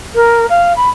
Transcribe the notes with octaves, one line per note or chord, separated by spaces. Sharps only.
A#4
F5
B5